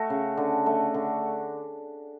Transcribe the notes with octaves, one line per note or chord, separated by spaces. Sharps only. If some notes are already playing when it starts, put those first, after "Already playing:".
Already playing: A3 F#4
C#3
D3
A3
D3